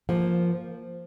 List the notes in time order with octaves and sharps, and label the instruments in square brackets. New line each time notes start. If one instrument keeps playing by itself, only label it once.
[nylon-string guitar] F3 A#3